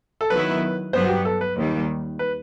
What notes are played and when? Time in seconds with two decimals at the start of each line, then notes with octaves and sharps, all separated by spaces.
0.21 A4
0.30 D#3 F#3 B3 E4 B4
0.93 G2 F#3 B3 C5
1.04 F#4
1.08 G4
1.25 A4
1.41 B4
1.57 D#2 D#3 G3
2.19 B4